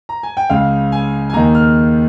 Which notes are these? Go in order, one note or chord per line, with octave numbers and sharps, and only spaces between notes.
A#5
G#5
G5
C#2 C#3 F5
G#5
G#5
D#2 D#3 A#5
F6